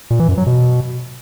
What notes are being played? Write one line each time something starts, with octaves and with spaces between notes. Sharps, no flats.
A#2
E3
F#2
F#3
B2